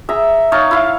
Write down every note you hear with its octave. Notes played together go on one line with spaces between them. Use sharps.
G#4 E5 A#5
D#4 C#5 F5 A5
E4 F5